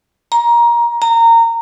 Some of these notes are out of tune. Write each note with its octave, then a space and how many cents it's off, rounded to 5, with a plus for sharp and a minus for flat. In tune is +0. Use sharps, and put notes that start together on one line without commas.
A#5 +20
A#5 -20